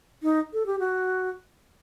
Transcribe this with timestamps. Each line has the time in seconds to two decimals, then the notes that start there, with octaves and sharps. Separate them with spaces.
0.23 D#4
0.53 A4
0.66 G4
0.79 F#4